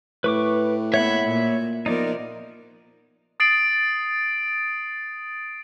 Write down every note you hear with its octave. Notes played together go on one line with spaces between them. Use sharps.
A2 B4 C#6 D6
A#3 B3 C#5 E5 F#5 B5
A#2
F3 B3 D#4 A#4 D5
D#6 A6 C7 D7 F#7